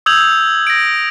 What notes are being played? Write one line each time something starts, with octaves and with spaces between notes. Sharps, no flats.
D#6 E6 G6 G#6 F7 F#7
A#6 D7